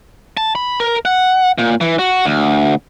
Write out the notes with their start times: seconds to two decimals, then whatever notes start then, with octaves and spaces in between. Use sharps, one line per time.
0.37 A5
0.55 B5
0.80 A#4
1.05 F#5
1.58 A#2
1.81 E3
1.99 F#4
2.25 D2